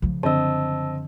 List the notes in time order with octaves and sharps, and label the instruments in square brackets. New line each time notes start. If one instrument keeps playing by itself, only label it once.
[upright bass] C#3 F3
[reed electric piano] F#2 D3 [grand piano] C4 D#5 [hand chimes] A5 E6